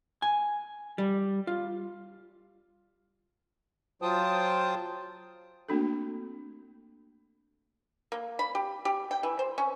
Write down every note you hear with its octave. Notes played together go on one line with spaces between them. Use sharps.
G#5
G3
F4
F#3 F4 C5 G5 A5 D#6
A3 A#3 C4 D4 F#4 A4
A#3
B5
G4
G4
G5
E3
C5
C#4